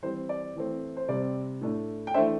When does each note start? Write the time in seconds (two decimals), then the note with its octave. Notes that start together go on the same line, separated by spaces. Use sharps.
0.03 E3 G3 C4 C5
0.29 D5
0.56 E3 A3 C4
0.97 C5
1.08 C3 G3 C4 D5
1.61 A2 A3 D4
2.07 G5
2.14 E3 A3 D4 C5 E5